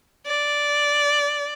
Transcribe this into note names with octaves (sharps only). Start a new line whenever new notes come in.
D5